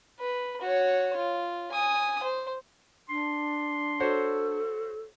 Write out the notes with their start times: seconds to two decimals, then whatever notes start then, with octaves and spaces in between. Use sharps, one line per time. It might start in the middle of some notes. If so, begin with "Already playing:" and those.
0.20 B4
0.61 F#4 C#5
1.17 F4
1.71 G#5 D#6
2.23 C5
3.09 D4 C6
4.00 F#4 A4 C5 C#5